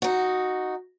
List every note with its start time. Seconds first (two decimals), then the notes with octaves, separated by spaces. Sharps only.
0.02 D#4 F#4